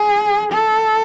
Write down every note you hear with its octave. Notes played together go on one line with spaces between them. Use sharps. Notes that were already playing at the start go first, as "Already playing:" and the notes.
Already playing: G#4
A4